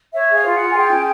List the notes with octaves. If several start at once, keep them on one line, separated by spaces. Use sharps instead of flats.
C#5 E5
G#4 F5
F4
F4 F#5
G#5
G#4 G5
C#4